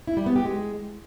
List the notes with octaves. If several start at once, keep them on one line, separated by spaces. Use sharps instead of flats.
E4
G3
B3
G4
G#3